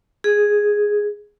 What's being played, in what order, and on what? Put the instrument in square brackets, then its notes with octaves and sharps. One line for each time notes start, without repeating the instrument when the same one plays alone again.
[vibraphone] G#4